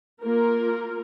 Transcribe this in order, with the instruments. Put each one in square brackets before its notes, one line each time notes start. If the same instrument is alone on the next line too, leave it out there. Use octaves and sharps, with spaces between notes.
[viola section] A#3 F4 A#4